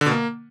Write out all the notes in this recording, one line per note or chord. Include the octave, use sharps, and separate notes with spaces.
D3
B2
A#3